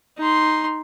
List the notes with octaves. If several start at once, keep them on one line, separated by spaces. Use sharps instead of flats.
D#4 C6